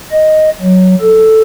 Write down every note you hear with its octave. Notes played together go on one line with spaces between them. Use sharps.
D#5
F#3
A4